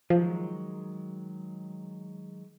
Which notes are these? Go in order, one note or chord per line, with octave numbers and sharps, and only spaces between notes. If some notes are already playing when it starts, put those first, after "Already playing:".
D#3 F3 F#3 G#3